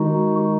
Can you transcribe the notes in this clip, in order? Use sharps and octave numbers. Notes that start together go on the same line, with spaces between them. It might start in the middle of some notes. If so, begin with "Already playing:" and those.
Already playing: D#3 G#3 D#4 F#4